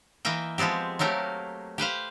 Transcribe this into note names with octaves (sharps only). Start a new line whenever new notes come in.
E3 A#3 D#5 E5 G5
F3 G#3 B3 C4 G4
F#3 A3 A#3 G4 A#4
G4 B4 C5 F5